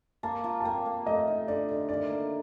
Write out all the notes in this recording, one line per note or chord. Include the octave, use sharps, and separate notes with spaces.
A#3 A5
F4
A5
A#3 G5
A#3
A3 D#5
D#4
D3 D5
D3
D#3 D5
A#3